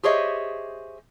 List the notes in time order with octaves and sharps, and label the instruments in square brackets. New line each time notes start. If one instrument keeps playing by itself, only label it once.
[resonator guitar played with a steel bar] G4 G#4 C5 C#5 D#5 E5